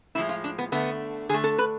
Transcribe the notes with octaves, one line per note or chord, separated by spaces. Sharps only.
A2 F3 G#3 E4
F4
D4
B3
D3 A3 B3
D3 A3 G#4
A4
B4